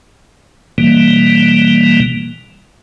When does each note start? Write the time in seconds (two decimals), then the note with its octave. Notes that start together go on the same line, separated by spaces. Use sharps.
0.78 B2 E3 G3 A#3